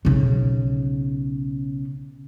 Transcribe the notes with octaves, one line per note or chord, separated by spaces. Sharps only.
B1 C#3